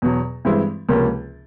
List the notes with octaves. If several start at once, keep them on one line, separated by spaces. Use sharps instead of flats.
E2 B2 F#3
G2 E3 G#3 C4 E4
C#2 C3 F3 A#3 C#4